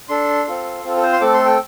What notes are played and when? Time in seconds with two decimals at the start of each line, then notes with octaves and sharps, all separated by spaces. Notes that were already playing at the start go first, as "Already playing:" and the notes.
0.09 D4 A4 C6
0.47 C4 F4 A4
0.83 C4 F4 A4
0.97 A4
1.03 C5
1.13 C6
1.21 A3 C4 A4 D6
1.34 C6
1.46 G5